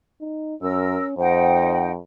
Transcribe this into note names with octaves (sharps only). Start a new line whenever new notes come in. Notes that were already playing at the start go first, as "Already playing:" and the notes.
D#4
F#2 C#4 A#4 E6
F2 D#4 C5 F#5 G5